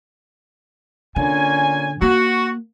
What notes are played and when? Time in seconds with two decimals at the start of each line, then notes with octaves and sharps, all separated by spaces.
1.16 A#2 D3 C#4 G#5
2.02 A#3 F#4